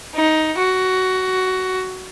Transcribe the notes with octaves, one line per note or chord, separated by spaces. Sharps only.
D#4
F#4